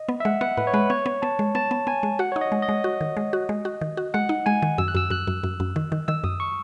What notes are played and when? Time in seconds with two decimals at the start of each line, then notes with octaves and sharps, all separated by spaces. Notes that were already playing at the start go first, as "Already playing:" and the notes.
Already playing: D#5
0.09 B3
0.20 E5
0.25 G#3 F#5
0.41 B3 F#5
0.57 A2 B4
0.67 C#5
0.74 G#3 B4
0.90 B3 C#5
1.06 B3
1.22 B3 A5
1.39 G#3
1.55 B3 A5
1.71 B3
1.87 B3 G#5
2.03 G#3
2.19 F#4 F#5
2.32 D#4 C#5
2.41 D#5
2.52 G#3
2.62 D#5
2.69 G#3
2.84 F#4
3.01 D#3
3.17 G#3
3.33 F#4
3.49 G#3
3.65 F#4
3.81 D#3
3.97 F#4
4.14 G#3 F#5
4.29 D#4
4.46 G#3 G#5
4.62 D#3
4.78 F#2 E6
4.88 F#6
4.95 F#2 E6
5.10 F#2 F#6
5.27 F#2
5.43 F#2
5.60 F#2
5.76 D#3
5.92 D#3
6.08 D#3 E6
6.24 F#2 D#6
6.40 C#6